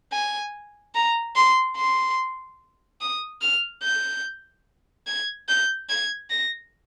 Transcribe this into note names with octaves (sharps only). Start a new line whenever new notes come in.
G#5
A#5
C6
C6
D#6
F6
G6
G#6
G6
G#6
A#6